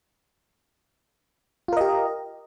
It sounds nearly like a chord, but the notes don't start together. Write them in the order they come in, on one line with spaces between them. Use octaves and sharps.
F4 A#4 D#5 G4